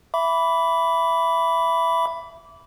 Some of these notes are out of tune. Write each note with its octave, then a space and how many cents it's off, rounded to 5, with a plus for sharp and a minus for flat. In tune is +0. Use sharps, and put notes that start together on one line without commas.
E5 +15 B5 +0 D6 -25